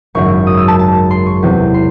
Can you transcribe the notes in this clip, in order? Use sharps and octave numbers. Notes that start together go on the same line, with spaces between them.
G#1 F#2 C#3 F#3 C#6
D#6
E6
A5
A5
C6
C#6
E2 C3 F#3
C6